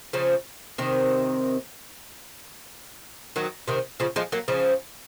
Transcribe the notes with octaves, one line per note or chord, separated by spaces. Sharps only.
C#3 F3
C3 D#3
D#3 F#3
C3 D#3
C#3 F3
F3 G#3
F#3 A#3
C#3 F3